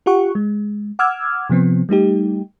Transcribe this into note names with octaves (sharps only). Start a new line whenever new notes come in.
F4 G4 F#5 C#6
G#3
F#5 D6 E6 F6 G#6
C3 F3 B3 C4
G3 A3 D#4 G4